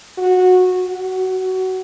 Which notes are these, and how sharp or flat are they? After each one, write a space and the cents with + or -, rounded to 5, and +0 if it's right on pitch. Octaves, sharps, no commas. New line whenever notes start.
F#4 -15
F#4 +20